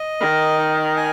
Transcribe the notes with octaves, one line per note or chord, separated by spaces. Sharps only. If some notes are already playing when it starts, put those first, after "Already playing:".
Already playing: D#5
D#3 A#4
D#4
G#5